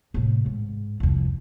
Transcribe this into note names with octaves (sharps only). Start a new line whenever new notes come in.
A2 C3
G#2
C2 F2